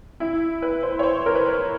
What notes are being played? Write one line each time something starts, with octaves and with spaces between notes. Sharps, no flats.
E4
B4
C5
C#5
C5
A#4
B4
C5